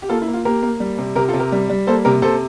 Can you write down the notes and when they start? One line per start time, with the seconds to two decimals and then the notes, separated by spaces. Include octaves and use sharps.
0.02 G4
0.09 A#3 F4 A4
0.22 E4
0.28 A#3
0.34 F4
0.45 A#3 G4 A#4
0.63 A#3
0.80 G3
0.98 C3
1.16 C3 G4 A#4
1.28 F4 A4
1.34 C3
1.39 G4 A#4
1.52 G3
1.69 G3
1.87 A#3 A4 C5
2.05 C3 G4 A#4
2.22 C3 A4 C5